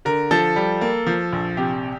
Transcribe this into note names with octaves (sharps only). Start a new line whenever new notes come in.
D3 A#4
F3 A4
G3
A#3
F3
A#1
C3 G4